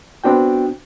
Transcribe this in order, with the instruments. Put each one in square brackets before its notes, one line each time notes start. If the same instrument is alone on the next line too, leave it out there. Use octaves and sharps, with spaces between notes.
[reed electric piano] B3 C4 D4 F#4 G5